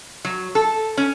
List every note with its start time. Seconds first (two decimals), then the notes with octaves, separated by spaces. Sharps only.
0.25 F#3
0.55 A4
0.97 C#4